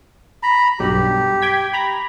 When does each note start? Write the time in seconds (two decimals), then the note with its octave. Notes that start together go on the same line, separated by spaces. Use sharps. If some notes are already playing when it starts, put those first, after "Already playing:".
0.43 A#5 B5
0.80 B1 G2 G4
1.42 G5 G#6 B6
1.73 A#5 B5